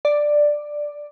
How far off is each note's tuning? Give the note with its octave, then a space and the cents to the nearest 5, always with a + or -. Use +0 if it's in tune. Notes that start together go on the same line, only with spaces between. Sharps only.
D5 +5